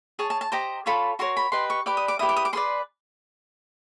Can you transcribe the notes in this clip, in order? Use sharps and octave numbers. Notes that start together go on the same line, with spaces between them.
G#4 C#5 A5
A5
A5
G4 C5 D#5 A#5
F4 A4 C#5 B5
F#4 A#4 C#5 C6
B5
G4 B4 D#5 C6
C#6
G4 B4 D5 D6
D#6
D6
E4 G4 B4 D#6
D6
D#6
D6
G#4 B4 D5 C6